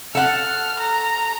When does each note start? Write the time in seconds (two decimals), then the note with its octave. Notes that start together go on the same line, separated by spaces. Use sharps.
0.15 A4 F#5 F6
0.79 A#5